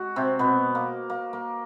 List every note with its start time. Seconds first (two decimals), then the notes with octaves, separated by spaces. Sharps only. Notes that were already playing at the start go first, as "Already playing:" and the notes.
Already playing: G#3 F#4
0.16 C3 C4
0.39 B2 B3
0.75 A#3
1.10 A#3
1.33 A#3